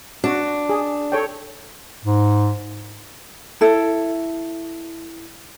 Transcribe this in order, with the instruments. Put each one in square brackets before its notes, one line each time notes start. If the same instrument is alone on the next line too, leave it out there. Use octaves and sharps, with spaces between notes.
[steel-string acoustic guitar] D4 [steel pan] F#4
[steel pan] G#4
A4 C#5 G5
[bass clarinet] G#2
[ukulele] E4 A4